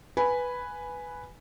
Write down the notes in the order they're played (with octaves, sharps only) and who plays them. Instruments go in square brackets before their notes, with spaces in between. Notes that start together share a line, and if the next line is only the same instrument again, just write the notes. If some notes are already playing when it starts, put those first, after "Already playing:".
[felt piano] B4 G#5 B5